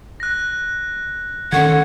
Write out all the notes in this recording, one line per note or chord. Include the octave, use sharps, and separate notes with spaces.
F#6 A#6
D#3 A3 C#4 F#5 C#6 G#6